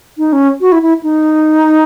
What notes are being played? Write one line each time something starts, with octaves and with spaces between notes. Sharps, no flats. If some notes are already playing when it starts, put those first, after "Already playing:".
D#4
C#4
F#4
E4
E4
D#4